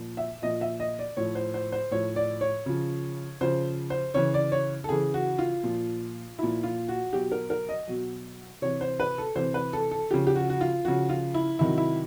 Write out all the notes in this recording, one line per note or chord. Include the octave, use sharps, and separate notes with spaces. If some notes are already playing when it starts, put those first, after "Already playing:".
Already playing: A#2 F3
E5
A#2 F3 D#5
E5
D#5
D5
A2 F3 C#5
C5
C5
C5
A2 F3 C#5
D5
C#5
C#3 F3
C#3 F3 C5
C5
C#3 E3 C#5
D5
C#5
A4
C#3 E3 G#4
F#4
F4
A#2 F3
A#2 F3 E4
F4
F#4
B2 F#3 G4
A#4
A#4
D#5
B2 F#3
C3 E3 C#5
C5
B4
A4
C3 E3 C5
B4
A4
A4
C#3 F3 G4
G4
F#4
F#4
F4
C#3 F3 F#4
F4
E4
C3 D#3 F#3 E4
E4